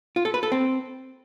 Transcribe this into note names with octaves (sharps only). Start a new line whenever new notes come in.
F4
A4
B4
A4
C4